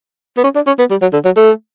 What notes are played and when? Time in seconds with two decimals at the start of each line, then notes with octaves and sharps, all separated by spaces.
0.37 B3
0.44 C#4
0.55 D4
0.67 C#4
0.79 B3
0.91 G3
1.02 F#3
1.13 D3
1.25 F#3
1.37 A3